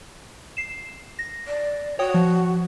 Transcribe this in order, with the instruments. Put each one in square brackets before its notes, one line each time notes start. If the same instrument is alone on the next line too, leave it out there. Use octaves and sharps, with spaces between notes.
[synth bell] C7 E7
A#6
[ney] D5
[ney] F#4 [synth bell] C#5 G5 D#6
[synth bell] F3